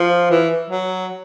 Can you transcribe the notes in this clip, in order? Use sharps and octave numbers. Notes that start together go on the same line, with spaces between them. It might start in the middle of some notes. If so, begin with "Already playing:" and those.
Already playing: F3
E3
F#3